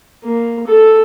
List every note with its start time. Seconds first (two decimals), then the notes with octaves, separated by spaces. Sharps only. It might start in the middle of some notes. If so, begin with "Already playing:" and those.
0.24 A#3
0.67 A4